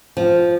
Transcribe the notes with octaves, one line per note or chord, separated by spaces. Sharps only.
F3